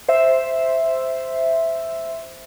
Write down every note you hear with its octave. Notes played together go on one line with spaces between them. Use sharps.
C5 E5